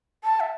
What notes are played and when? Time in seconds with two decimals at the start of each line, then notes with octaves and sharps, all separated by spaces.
0.24 A5
0.40 E5